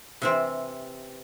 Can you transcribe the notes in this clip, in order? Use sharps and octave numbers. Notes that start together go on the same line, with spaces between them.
C3 E3 C4